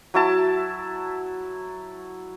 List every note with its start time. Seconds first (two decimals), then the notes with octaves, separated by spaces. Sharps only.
0.14 F#3 E4 A5